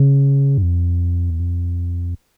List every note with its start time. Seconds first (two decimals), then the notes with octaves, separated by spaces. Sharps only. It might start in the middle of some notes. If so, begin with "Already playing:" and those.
Already playing: C#3
0.58 G2
0.62 F2
1.30 E2
1.40 F2